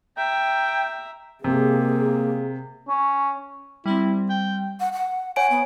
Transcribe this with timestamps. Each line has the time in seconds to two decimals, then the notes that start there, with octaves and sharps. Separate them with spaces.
0.17 E5 G5 A#5
1.44 C3 G#3 A#3 G#4
2.88 C#4
3.86 G3 C4 E4
4.29 G5
4.80 F#5
4.93 F#5
5.36 C#5 F#5 G#5 D7
5.50 B3